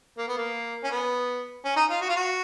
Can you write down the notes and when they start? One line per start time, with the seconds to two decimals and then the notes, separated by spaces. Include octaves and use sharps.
0.18 A#3
0.28 B3
0.37 A#3
0.83 C#4
0.91 B3
1.65 C#4
1.76 D#4
1.90 F4
2.01 F#4
2.09 F4
2.16 F#4